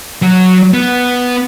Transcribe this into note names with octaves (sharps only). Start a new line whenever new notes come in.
F#3
B3